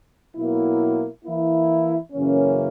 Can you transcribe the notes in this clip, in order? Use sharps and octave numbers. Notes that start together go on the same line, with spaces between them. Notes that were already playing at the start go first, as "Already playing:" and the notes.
B2 F#3 A#3 E4
E3 A#3 E4
F#2 C#3 E3 A#3 C#4